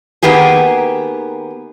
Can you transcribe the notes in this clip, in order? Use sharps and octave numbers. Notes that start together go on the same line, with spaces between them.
D#3 A#3 B3 G4 G#4